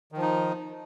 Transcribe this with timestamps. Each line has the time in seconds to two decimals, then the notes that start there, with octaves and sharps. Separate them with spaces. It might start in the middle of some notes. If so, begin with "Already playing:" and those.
0.12 D#3
0.17 F3
0.22 D#4